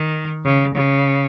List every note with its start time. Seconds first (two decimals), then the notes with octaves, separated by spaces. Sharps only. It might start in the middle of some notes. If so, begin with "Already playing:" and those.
Already playing: D#3
0.44 C#3
0.75 C#3